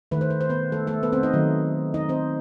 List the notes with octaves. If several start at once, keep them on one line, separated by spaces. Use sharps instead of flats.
D#3 A3 B4
C5
B4
C5
B3 B4
A3 A4
A3 A4
B3 B4
C4 C5
D#4 D#5
D#3 F#3 A3
D#4 D#5
C4 C5